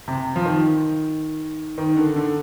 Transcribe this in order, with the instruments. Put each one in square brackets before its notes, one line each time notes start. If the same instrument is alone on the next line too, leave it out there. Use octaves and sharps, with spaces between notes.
[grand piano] C3
F3
D#3
D#3
D3
D3